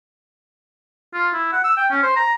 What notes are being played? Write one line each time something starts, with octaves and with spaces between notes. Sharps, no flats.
F4
E4
F#5
E6
G5
C#4
C5
A#5